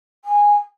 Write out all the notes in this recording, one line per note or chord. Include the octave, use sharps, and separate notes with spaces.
G#5